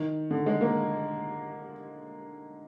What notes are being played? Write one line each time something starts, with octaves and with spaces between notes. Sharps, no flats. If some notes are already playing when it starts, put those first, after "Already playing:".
Already playing: D#3
D3
G#3
A#3